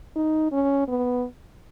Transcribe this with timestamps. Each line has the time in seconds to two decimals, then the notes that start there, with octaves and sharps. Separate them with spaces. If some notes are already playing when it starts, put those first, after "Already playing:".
0.16 D#4
0.52 C#4
0.88 B3